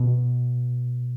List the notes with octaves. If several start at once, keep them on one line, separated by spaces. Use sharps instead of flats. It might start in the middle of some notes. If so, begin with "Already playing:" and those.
Already playing: B2